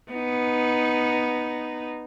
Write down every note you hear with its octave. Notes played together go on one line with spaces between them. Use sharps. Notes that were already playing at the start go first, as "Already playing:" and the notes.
B3 D#4